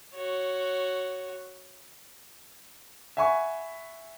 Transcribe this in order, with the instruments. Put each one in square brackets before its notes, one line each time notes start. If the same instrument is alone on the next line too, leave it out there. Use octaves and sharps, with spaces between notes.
[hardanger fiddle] F#4 C#5
[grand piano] E5 F#5 G#5 B5 C#6